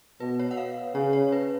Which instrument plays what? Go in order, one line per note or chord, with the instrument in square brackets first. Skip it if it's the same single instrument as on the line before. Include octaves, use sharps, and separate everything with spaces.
[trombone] B2 [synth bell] B4
[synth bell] C#5
F#5
F5
[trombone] C#3 [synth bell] C#5
[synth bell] C#5
B4